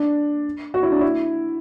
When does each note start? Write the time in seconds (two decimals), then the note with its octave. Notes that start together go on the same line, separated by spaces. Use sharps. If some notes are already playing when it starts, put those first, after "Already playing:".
Already playing: D4
0.74 F#4
0.83 E4
0.92 D4
1.01 E4